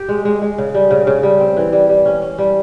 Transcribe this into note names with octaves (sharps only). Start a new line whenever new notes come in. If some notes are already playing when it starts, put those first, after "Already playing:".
Already playing: G4
G#3
G#3
G#3
C#3
G3
C#3
C#3
G3
C4
E3
G3
G3
C#4
C#4
G3